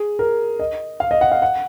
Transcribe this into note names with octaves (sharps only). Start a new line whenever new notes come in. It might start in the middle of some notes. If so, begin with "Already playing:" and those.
Already playing: G#4
A#4
D#5
F5
D#5
F#5
F5
F#5